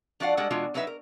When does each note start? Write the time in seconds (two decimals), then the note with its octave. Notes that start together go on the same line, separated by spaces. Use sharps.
0.20 F3 D4 F#4 D5 F5 F#5
0.37 G3 G#3 D4 A4 F#5
0.50 B2 E3 G#3 D4 F4 F#4
0.74 F#3 D4 D#4 B4 E5
0.87 A#4